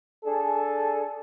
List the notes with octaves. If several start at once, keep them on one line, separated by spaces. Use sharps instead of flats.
D4 G#4 A4